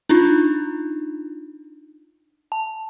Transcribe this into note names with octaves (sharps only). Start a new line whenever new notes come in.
D4 D#4 F4
A5